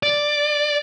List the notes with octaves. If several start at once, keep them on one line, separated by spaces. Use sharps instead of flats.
D5